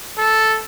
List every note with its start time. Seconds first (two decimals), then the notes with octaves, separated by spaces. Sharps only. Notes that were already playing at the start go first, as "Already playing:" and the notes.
0.18 A4